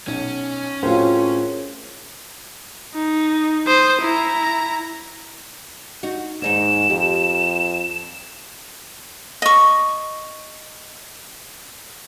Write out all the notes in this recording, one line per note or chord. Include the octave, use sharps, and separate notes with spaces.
B1 C#4
A2 C4 F4 F#4 G#4 A#4 C5 C#5
D#4
C5 D#6
E4 A#5
D#4 F#4
D#2 G#2 D#4 C#5 E7
F2 G4
D#5 C#6